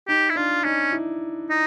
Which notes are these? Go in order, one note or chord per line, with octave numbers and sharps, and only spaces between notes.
D#4 G4
E4
D4 F4
C#4 D#4
E4
D#4